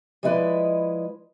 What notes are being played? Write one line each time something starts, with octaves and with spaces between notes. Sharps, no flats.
F3 G#3 E4 B4 D5 D#5